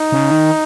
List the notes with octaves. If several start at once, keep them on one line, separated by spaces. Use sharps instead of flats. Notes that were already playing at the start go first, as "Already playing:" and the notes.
Already playing: D#4
C#3
D#3